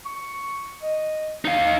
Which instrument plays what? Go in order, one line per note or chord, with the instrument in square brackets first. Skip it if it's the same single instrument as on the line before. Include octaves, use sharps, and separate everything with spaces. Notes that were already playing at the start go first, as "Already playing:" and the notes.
[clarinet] C#6
D#5
[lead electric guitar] D#4 F5
[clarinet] D#5